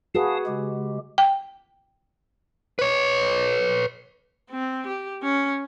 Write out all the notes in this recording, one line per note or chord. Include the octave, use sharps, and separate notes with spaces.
F#4 G#4 B4 F5 A5 D#6
C#3 G#3 G4
G5
B4 C#5
C4
G4
C#4